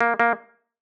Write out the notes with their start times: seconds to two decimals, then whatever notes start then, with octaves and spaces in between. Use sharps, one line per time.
0.01 A#3
0.20 A#3